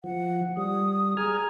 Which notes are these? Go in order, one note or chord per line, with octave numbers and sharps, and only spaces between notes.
F3 F#5
G3 D#6
G#4 G#5 A#5 F6